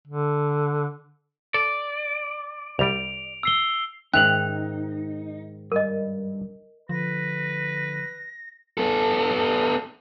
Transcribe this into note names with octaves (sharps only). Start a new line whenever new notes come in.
D3
A4 D5
C2 G3 D7 F7
E6 C7 G7
G#2 D#3 C#4 D#4 E5 F#6 F7 F#7
G2 A#4 D#5
D3 F3 B4 A#6
B3 A4